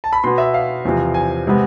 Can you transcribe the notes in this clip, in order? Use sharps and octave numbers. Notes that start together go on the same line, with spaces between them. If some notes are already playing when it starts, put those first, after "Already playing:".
A5
B5
B2 B3 C6
E5
F5
E2 C3 F3
G#5
C3 G#3 B3